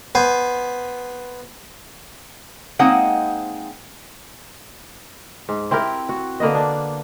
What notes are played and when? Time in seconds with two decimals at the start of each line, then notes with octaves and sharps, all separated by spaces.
0.15 B3 C5 G#5
2.79 G#3 A#3 C4 D#4 C5 F#5
5.49 G#2
5.71 C4 E4 G4 A#4
6.09 F#4
6.40 D3 A#3 B3 D#5
6.55 D4